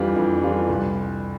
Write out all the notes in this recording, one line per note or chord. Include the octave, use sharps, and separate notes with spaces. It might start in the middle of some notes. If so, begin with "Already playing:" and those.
Already playing: F2 E3 G3 D4 F4
F2
E3 G3 D4 F4
C2